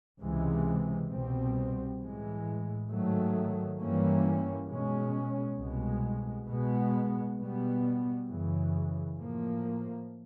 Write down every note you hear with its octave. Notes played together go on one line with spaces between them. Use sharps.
C#2 C3 E3 G#3
C2 B2 G3 C4
A2 E3 G#3
G#2 D#3 F#3 A3
G2 E3 G3 A#3 C#4
B2 G#3 C#4
C2 B2 G#3
B2 G#3 B3
B2 G3 B3
F#2 C#3 E3
A2 F3 A#3